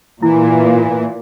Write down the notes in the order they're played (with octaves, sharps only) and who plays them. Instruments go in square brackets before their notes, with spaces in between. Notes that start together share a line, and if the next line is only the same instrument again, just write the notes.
[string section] A#2 [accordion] E3 [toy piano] E4